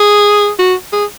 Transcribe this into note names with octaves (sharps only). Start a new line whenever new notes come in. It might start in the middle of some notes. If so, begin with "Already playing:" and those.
Already playing: G#4
F#4
G#4